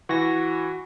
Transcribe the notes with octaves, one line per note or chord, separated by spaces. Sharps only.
E3 F#4 A#6